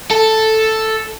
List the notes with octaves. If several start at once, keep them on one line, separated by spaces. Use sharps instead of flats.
A4